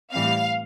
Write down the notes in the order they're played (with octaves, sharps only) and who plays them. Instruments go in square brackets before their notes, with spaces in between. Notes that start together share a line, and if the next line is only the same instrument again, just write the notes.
[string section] A2 E3 G3 C4 F5